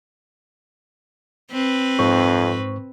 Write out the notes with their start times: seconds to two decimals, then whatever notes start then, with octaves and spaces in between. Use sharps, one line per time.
1.51 C4 B4
1.99 F2 G#2 C5 C#6